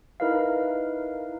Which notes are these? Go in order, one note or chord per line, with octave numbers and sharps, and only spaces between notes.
D#4 E4 A#4 B4 D#5 F5